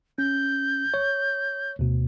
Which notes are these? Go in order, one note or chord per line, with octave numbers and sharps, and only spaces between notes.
C#4 G6
C#5
D2 B2